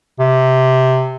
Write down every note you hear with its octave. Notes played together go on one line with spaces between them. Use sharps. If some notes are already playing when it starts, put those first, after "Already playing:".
C3